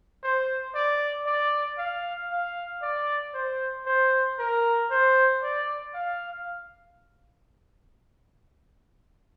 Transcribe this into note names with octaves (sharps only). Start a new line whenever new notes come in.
C5
D5
D5
F5
F5
D5
C5
C5
A#4
C5
D5
F5